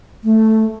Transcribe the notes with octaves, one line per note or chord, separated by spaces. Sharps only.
A3